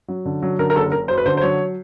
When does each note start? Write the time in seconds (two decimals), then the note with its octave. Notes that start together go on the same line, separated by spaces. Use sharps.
0.08 F#3
0.25 D3
0.42 F#3
0.59 D3 A#4
0.70 A#4
0.76 F#1 A4
0.92 F#1 A#4
1.08 F#2 C5
1.18 B4
1.26 D3 C5
1.37 C5
1.42 F#3 C#5